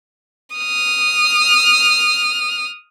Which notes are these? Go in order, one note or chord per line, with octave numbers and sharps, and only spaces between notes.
D#6 F6